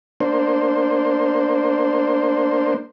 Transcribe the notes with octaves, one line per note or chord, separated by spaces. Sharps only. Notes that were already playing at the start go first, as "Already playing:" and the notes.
A#3 D4 C5